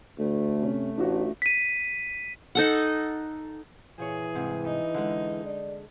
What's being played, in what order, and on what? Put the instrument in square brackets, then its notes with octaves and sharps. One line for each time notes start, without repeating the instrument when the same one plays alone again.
[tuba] D2 [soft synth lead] A3
[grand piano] C3 C#4
[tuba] A1 [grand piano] D4 F4 F#4
[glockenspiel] B6 D#7
[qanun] D#4 A4 F#5
[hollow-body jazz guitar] A#2 C#5 [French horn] E3 [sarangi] G#4
[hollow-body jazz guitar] C2 G#2 C3
[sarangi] D#4
[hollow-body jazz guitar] D3 G#3
[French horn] D5